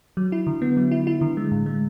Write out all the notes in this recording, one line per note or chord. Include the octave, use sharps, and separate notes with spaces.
F#3
E4
D3
B3
F#3
E4
E4
D3
G#3
A2
G#3